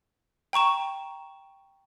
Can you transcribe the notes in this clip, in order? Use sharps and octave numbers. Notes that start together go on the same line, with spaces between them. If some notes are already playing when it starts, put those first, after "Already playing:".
G5 A#5 C#6 E7